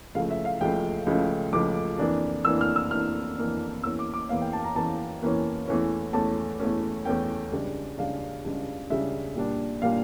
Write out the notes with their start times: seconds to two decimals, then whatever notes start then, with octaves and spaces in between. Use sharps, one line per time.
0.15 C#2 C#3 F3 A3 F5
0.31 E5
0.45 F5
0.61 C#2 C#3 F3 A3 G5
1.06 C#2 C#3 F3 A3
1.53 C#2 C#3 F3 A3 D6
1.99 F2 E3 A#3 D4
2.45 F2 E3 A#3 D4 E6
2.61 F6
2.76 E6
2.91 F2 E3 A#3 D4 F6
3.37 F2 E3 A#3 D4
3.83 E2 E3 A#3 C#4 E6
3.99 D6
4.14 D6
4.29 E2 E3 A#3 C#4 F5
4.42 G5
4.53 A5
4.64 A#5
4.75 E2 E3 A#3 C#4 A5
5.22 E2 E3 A#3 C#4
5.68 E2 E3 A3 C#4
6.13 E2 E3 A3 C#4 A5
6.60 E2 E3 A3 C#4
7.05 E2 E3 A3 C#4 G5
7.52 C#2 C#3 G3 D4
7.98 C#2 C#3 G3 D4 F5
8.45 C#2 C#3 G3 D4
8.90 C#2 C#3 G3 D4 E5
9.36 A#2 G3 D4
9.82 A#2 G3 D4 F5